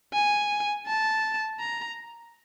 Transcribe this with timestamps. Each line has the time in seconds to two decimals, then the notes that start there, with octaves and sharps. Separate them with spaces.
0.13 G#5
0.87 A5
1.60 A#5